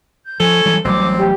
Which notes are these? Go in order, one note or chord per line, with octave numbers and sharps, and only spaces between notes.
G6
F3 C#4 A4 G#5 G#6
E3 F#3 G3
A1 F#3 G3 C4 D6
G4